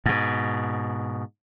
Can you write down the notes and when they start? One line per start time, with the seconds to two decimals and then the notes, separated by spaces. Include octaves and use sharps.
0.06 G#2 B2